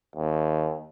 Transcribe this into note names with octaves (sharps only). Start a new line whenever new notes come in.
D#2